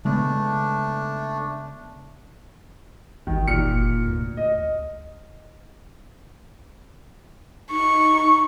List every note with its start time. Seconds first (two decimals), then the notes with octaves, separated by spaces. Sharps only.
0.05 C#3 G#3 A3 B3 D4
3.27 G#1 D#3
3.48 F#1 A#2 F6 C#7
4.06 D2
4.37 D#5
7.71 D#4 C#6